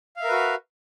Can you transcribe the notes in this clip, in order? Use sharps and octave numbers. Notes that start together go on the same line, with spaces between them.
F#4 A#4 B4 E5 F5